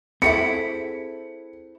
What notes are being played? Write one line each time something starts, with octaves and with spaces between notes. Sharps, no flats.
C4 E4 F#4 G#4 A4 B5 C#7